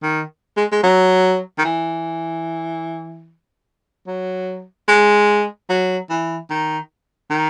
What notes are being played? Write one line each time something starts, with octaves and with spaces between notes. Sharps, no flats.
D#3
G#3
G#3
F#3
D#3
E3
F#3
G#3
F#3
E3
D#3
D#3